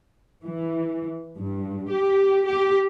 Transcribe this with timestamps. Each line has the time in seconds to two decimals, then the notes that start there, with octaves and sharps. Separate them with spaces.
0.43 E3
1.38 G2
1.89 G4
2.46 G4